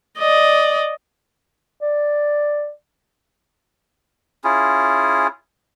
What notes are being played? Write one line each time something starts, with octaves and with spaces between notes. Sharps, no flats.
D5 D#5
D5
C#4 E4 F4 G#4